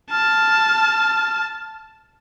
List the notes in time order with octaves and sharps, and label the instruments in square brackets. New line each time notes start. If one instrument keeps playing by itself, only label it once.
[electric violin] A5 [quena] F6